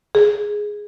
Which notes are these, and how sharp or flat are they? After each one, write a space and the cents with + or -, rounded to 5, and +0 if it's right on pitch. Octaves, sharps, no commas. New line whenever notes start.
G#4 +0